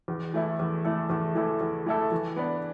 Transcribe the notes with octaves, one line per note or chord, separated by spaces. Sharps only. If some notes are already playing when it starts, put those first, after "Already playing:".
E2
E3 A3 E4 A4
E2
E3 A3 E4 A4
E2
E3 A3 E4 A4
E2
E3 A3 E4 A4
E3
B3 D4 B4